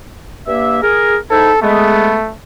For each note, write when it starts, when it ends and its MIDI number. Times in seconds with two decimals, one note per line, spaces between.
0.48 0.79 43
0.48 0.79 58
0.48 0.79 76
0.83 1.16 68
0.83 1.16 70
1.30 1.52 44
1.30 1.52 63
1.30 1.52 64
1.30 1.59 69
1.62 2.15 56
1.62 2.32 57
1.62 2.15 59